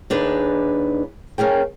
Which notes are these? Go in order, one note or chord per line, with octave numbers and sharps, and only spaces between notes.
D#2 D4 D#4 G#4 B4
A#3 C#4 G#4 G5